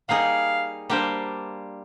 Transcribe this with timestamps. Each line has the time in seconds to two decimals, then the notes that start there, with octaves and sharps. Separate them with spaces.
0.09 G3 A#3 D#4 G#4 F5
0.90 G3 A#3 D4 G4 C5